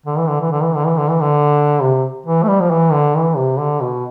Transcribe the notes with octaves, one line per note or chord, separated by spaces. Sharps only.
D3
E3
D3
E3
D3
E3
D3
E3
D3
E3
D3
C3
E3
A3
G3
F3
E3
D3
E3
C3
D3
B2